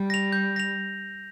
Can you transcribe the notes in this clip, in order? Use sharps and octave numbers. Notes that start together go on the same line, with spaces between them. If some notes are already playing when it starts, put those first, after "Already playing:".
Already playing: G3
A#6 F7
G6
A#6 F7